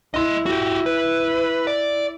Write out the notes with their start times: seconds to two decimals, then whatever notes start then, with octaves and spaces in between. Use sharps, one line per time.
0.14 E4 D#5 C6
0.46 F#4 G4
0.86 B4
1.67 D5